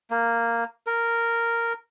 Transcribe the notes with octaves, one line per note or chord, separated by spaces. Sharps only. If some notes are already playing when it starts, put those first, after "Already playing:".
A#3
A#4